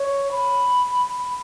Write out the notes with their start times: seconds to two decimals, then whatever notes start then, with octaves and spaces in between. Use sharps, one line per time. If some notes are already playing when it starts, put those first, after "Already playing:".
Already playing: C#5
0.31 B5